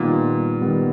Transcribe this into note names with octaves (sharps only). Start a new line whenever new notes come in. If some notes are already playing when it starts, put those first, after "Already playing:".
Already playing: A#2 D#3 G3 B3
D#3 G3 B3